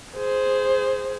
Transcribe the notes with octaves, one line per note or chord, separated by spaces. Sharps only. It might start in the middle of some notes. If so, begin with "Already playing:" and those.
G#4 C5